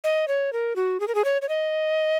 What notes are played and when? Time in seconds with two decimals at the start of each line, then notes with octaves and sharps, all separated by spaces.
0.04 D#5
0.28 C#5
0.53 A#4
0.76 F#4
1.00 G#4
1.08 A#4
1.15 G#4
1.25 C#5
1.42 C#5
1.49 D#5